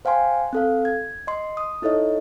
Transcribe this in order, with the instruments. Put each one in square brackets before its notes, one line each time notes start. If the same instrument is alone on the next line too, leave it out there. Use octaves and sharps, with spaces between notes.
[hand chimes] C5 F5 G5 G#5 C6
C4 A4 F5
G#6
D#5 C6
D#6
D#4 E4 A4 C#5 D#5